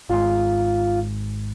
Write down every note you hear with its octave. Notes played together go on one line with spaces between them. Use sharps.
G#1 G#2 F4